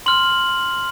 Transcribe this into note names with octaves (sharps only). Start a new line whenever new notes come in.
C6 F6 F#7